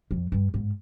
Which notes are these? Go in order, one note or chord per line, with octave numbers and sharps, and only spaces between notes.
F2
G2
G#2